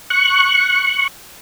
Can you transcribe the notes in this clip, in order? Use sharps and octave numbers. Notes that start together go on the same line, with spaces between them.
C#6 F#6